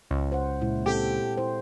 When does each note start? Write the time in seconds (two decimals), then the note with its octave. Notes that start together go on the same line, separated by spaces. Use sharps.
0.11 C#2
0.32 C5 F#5
0.61 A#2 G#3 E4
0.86 C4 G4 A4
1.37 E4 C5